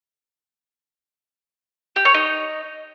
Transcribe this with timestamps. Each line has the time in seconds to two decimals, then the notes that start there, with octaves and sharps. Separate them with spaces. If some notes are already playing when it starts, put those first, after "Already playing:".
1.96 G4
2.05 C#5
2.14 D#4